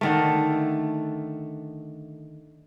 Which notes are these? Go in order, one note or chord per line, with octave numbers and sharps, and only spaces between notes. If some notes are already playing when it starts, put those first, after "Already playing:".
D3 D#3 A3